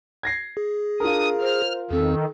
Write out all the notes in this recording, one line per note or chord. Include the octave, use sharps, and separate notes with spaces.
G#6 A#6 C7
G#4
D4 F4 A#4 D#6
C5 F6
E2 D#3 C4 A4